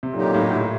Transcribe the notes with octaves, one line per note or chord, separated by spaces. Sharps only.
C3
A#2 D3 F#3 A#3 D#4 G4
A#2
A2
A2